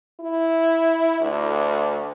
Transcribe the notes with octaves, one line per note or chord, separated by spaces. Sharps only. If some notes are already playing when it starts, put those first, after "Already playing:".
E4
D2